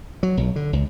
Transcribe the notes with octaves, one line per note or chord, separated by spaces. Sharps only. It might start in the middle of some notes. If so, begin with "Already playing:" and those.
F#3
B1
D3
C#2